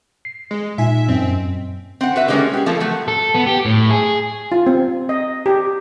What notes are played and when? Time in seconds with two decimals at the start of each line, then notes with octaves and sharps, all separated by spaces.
0.25 C7
0.51 G#3
0.78 A#2 D#4 E5 G#5
1.09 F#2 C4 D#5
2.01 C4 F#5
2.16 F#4 B4 E5
2.28 D3 G3 G#3 A#3 B3 C#4
2.53 G4 G#4
2.66 F3 A3 A#3 C4 A4
2.80 F#3 A3
3.08 A4
3.35 B3
3.47 G4
3.66 A2
3.90 G#4
4.52 F4
4.67 C4
5.09 D#5
5.46 G4